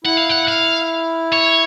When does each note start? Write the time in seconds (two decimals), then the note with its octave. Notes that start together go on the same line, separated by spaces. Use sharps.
0.05 E4 F#5
0.17 F5
0.29 F#5
0.48 F5
1.33 C#5